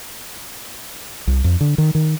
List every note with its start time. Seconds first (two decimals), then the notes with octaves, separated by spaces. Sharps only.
1.27 C2
1.44 F2
1.61 D3
1.78 D#3
1.95 D#3